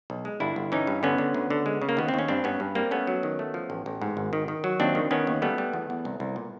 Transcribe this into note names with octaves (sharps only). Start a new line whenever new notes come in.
B1
G#3
G1 D4 E4
G1
E3 C#4 D#4
G2
D3 B3 C#4
D3
D2
D3
G#3
C#3
A#3
D#2 B3
C4
D#2 C#4
G2 C4 D4
G2 B3 C#4
G2
G3 A#3 C4
A3 B3 C#4
F#3
D#3
A3
F3
A1
A1
G#2
G#1
D#3
D#3
F#3
D#2 C4 D4
D#3
D#3 B3 C#4
D#2
G3 A3 B3
G3
E2
E2
C2
C2
A#2